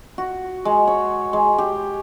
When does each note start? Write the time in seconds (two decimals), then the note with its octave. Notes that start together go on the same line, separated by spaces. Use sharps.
0.18 F#4
0.65 G#3
0.88 C#5
1.33 G#3
1.58 G4